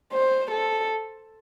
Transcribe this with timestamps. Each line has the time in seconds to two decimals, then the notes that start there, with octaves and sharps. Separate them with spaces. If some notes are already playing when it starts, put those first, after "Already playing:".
0.13 C5
0.51 A4